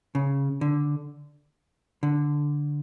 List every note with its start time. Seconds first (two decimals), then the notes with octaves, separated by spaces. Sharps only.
0.15 C#3
0.61 D3
2.03 D3